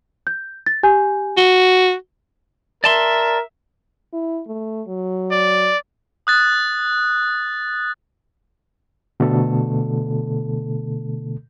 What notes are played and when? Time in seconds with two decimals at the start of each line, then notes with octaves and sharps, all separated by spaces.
0.27 G6
0.66 A6
0.83 G4 G#5 G6
1.37 F#4 G7
2.84 A#4 D5 E5 A5 C6
4.13 E4
4.47 A3
4.87 F#3
5.31 D5
6.27 D#6 F#6 A6
9.20 B2 D3 A3 A4